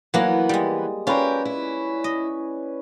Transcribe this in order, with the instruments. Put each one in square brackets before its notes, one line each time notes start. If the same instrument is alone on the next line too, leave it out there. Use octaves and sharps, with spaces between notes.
[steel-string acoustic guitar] E3 B3 [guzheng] F#3 A#3
[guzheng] G3 G#3 [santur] D#6
[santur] C#4 B4 D5 [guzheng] F4 F5 [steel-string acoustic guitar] G4 A#4
[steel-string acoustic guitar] E4
[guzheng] D#5